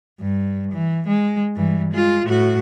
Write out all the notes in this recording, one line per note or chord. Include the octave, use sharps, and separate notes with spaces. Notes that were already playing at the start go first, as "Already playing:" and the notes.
G2
E3
G#3
G2 E3
G#3 F4
A2 F#4